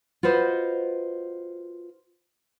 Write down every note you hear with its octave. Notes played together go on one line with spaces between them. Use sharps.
F4 F#4 B4 C5 D#5